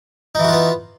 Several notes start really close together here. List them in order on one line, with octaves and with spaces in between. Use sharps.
D#4 E3 F#4 F4 B3